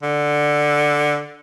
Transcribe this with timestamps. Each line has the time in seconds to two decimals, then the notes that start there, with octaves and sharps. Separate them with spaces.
0.02 D3